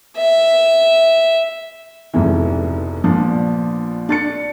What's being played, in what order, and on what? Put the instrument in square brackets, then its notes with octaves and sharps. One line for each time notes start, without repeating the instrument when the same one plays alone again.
[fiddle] E5
[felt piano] F1 F2 G#2 B2 E3
A#1 F3 B3 D4
D4 A6 C#7